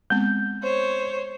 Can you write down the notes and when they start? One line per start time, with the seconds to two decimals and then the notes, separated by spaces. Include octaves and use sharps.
0.10 G#3 B3 C4 G6
0.63 C5 C#5